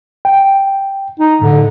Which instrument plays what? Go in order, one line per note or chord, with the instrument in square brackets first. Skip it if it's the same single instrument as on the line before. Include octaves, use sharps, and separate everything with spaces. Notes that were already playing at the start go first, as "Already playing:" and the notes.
[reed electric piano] G5
[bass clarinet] D#4
[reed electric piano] A2 [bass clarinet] D3